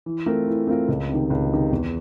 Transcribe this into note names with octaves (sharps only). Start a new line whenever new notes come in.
E3
A3 C4 F4 A#4
E3
A3 C4 F4 A#4
C#2
C3 D#3
C#2
C3 D#3
E2